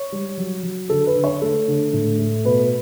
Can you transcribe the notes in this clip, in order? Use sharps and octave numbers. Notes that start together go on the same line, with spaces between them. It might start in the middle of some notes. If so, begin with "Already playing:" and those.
Already playing: C#5
G3
F#3
F#3
D3 A4
B4
D3
C#5
A3 A4
D3
A2
A3
B2 B4